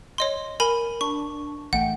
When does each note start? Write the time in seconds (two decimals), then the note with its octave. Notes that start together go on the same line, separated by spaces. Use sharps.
0.18 C#5 D#5 C6
0.60 A#4 G#5 B5
1.01 D4 C#6
1.73 A1 A3 F#5 G5